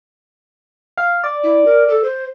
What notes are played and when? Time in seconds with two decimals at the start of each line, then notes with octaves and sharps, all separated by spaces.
0.97 F5
1.24 D5
1.44 E4
1.66 A#4
1.88 A4
2.04 C5